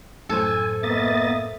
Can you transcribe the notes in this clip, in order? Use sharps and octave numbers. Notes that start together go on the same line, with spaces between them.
F#2 A2 A4 C5 G#5
A#3 B3 D#5 E5 A6